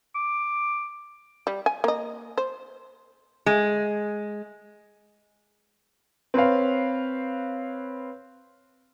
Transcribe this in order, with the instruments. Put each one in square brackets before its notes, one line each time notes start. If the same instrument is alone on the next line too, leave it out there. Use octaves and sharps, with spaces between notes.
[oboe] D6
[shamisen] G3
G#5
A#3 D#5
C5
[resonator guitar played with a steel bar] G#3
[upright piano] C4 B4 C#5 F5